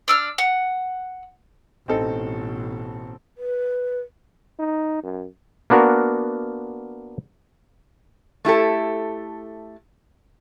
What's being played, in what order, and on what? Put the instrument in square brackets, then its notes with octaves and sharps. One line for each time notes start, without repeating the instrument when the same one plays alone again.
[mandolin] D4 E6 F6
F#5
[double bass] A1 B2 [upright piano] C4 D#4 A4
[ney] B4
[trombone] D#4
F#2
[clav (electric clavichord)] A#3 B3 D4 F#4 A#4
[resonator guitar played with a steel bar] A3 E4 G4 A4